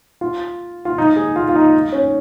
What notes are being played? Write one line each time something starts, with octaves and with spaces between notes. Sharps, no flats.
F4
F4
D#4
G#4
F4
F4
D#4
C#4